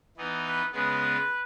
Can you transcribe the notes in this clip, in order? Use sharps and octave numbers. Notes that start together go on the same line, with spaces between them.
E3 B3 D#4
B4
C#3 G#3 B3 B4